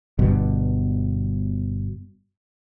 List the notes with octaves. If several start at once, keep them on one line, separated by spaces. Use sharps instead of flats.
G1 G2 B2